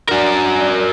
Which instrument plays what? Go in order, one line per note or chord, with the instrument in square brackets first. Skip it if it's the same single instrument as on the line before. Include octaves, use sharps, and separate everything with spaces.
[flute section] D4 D5 G#5 [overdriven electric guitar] F#4 A#4